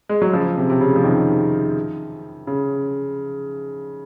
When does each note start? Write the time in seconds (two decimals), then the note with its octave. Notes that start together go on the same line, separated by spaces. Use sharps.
0.09 G#3
0.22 F#3
0.33 C#3 F3
0.57 C3
0.70 C3
0.81 C#3
0.96 F3
1.04 C3 D#3
2.47 C#3